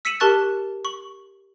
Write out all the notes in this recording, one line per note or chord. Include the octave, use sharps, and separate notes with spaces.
E6 B6 C#7 D#7 E7 F#7
G4 A#4 A5 C#6 F#6 A6
C#6 F#7